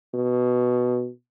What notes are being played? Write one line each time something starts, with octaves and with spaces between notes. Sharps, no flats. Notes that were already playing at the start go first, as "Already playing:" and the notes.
B2